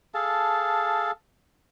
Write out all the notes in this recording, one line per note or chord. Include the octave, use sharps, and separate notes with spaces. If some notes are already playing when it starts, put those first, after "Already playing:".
G#4 A4 F5 A5